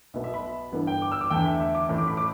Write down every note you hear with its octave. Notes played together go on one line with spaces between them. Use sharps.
B1 B2 B3 E5
E5
B5
G1 G2 E3 B3
G5
D6
E6
D6
E2 D3 A3 G5
E5
E5
D6
A1 A2 E3
D6
B5
D6